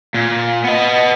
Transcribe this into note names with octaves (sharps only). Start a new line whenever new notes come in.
A#2
B3 D#5